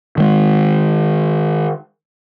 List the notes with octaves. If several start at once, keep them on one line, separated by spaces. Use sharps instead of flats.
D#3 G#3